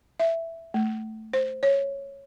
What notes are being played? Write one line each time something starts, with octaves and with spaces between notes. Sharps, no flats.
E5
A3
C5
C#5